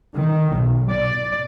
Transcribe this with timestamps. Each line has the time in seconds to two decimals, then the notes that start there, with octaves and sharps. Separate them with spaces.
0.16 D#3
0.55 B1
0.90 D5